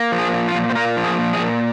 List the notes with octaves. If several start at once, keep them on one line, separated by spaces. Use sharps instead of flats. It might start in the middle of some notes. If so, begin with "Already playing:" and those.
Already playing: A#3
F3
G#4
A#2
F4
A#2
C5
A#3 A#4
F3
G#4
A#2
G#4
A#2